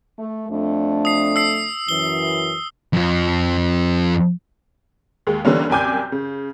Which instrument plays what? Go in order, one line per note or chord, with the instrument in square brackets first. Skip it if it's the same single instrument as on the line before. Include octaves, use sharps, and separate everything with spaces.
[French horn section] A3
F2 A3 D4
[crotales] D#6 C7
E6 C7
[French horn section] F#2 E3 [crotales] G7
[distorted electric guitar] F2 F3
[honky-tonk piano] D#2 G#3
D3 E3 G3 A#3 B3 C#4
C2 F#2 G5 G#5 D6 G6
C#3